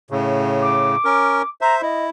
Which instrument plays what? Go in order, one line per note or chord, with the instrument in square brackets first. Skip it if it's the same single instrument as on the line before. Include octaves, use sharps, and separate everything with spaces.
[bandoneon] A2 C#3
[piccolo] D6
[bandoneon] C#4 A#4
[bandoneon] C5 E5 [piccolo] A#5
[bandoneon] E4 [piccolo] D#5